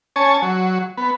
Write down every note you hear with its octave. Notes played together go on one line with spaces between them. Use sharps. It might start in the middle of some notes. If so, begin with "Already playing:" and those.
C#4 C#5 G#5 A5
F#3
B3